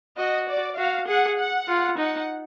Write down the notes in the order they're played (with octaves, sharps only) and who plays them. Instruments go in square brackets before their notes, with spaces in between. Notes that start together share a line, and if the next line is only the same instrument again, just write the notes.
[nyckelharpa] F#4 [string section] D#5
[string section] D5
[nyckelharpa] F#4 [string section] F5
[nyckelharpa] G#4 [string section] F#5
[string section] F#5
[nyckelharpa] F4
[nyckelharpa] D#4 [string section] F#5